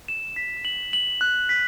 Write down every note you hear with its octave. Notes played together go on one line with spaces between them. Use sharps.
E7
B6
F#7
F#7
F#6
B6